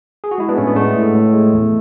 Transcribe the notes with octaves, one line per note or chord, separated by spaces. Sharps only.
G#4
F#4
G#3 E4
B3 D4
A2 A3 C#4
B3
G#3 A3
A2
A2
G#3
E2